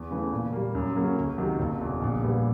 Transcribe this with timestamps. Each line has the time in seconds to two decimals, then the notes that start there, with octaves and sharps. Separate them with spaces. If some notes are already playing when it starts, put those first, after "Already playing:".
Already playing: E2
0.11 C#3 E3 A3
0.32 A#2
0.53 G3 A#3
0.75 F#2
0.95 C#3 F#3 A#3 C#4
1.17 C#2
1.38 C3 D#3 F#3
1.59 F#1
1.81 E2 B2
2.02 A#1
2.23 A#2 G3 B3